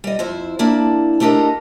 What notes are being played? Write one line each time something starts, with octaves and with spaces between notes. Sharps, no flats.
G3 D#5
F2 E4 C5
A#3 D4 E4 A5
A3 D4 G4 A4 A#4 D#5